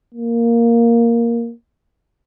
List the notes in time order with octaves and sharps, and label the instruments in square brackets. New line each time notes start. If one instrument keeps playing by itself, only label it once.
[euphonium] A#3